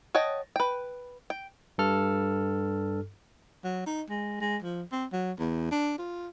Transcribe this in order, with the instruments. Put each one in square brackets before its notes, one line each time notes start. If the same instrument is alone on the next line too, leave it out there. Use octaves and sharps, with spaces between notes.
[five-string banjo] C#5 D#5 F#5 G5 A5
B4 G5
G5
[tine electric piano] G2 A4 F6
[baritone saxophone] F#3
D#4
G#3
G#3
F3
C4
F#3
E2
D4
F4